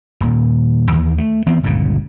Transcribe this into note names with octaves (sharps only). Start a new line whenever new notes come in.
D#1 A#2
D#2 E3
A3
E3 B3 C4
G1 C#2 A#2 C#3